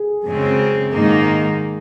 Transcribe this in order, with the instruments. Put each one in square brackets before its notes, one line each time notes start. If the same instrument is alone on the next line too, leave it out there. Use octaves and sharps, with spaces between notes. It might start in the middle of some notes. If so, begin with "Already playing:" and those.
Already playing: [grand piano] G#4
[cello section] F#2 C#3 G#3 C4
G#2 D#3 A#3 D#4